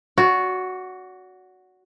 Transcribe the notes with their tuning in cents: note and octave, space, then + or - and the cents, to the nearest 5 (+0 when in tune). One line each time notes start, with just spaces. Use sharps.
F#4 +0 D5 -45